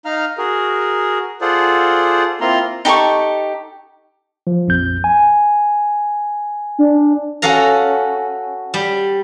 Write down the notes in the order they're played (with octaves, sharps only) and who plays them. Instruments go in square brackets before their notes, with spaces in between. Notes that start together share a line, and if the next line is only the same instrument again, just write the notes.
[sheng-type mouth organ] D#4 F5 A#5 F6
F#4 G#4 A#4
F4 G#4 A4 C5 D5 F#5
A#3 C4 E4 F4 A#5 C6
[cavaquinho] D#4 G4 A4 C#6
[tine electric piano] F3
A#1 F2 G6
G#5
[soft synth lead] D4
[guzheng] C#4 F#4 A4 F5 A#5
G3